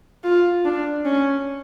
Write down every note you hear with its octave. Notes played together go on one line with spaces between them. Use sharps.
F4
D4
C#4